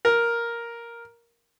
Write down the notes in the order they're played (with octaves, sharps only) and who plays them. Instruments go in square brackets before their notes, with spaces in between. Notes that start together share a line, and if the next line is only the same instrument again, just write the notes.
[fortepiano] A#4